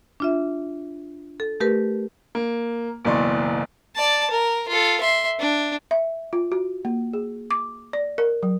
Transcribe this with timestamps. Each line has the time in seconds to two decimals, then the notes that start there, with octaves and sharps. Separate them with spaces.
0.20 D4 F4 E5
1.40 A4
1.60 A3 G4 A#4 B4
2.35 A#3
3.05 F#1 B1 E3 D5 C6 C#6
3.96 D5 A5
4.30 A#4
4.68 F4 A4
5.01 E5 C6
5.40 D4
5.91 E5
6.33 F4
6.52 F#4
6.85 A#3
7.13 G#4
7.51 D6
7.93 D5
8.18 A#4
8.43 F#3